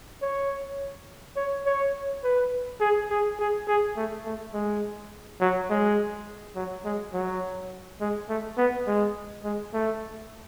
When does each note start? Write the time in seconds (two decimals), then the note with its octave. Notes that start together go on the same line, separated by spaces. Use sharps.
0.22 C#5
1.36 C#5
1.66 C#5
2.24 B4
2.81 G#4
3.10 G#4
3.39 G#4
3.68 G#4
3.97 A3
4.25 A3
4.54 G#3
5.41 F#3
5.70 G#3
6.56 F#3
6.85 G#3
7.14 F#3
8.01 G#3
8.29 A3
8.58 B3
8.87 G#3
9.44 G#3
9.74 A3